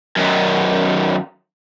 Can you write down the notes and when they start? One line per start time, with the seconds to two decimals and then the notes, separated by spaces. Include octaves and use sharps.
0.16 F#2 D#3